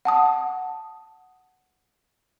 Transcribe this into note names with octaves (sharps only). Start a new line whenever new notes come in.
F#5 A5 D#6